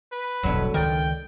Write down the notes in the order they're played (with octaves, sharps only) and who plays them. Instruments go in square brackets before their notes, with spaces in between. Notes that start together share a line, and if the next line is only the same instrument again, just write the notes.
[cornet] B4
[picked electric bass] E1 A#1 B2 [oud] D3 F#3
[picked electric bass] C#2 D#3 [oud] A#4 D5 [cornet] G5